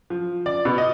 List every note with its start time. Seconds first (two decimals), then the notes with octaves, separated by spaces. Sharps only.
0.10 F3
0.46 D5
0.65 B2
0.78 D#5